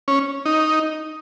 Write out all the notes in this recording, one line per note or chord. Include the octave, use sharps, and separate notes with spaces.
C#4
D#4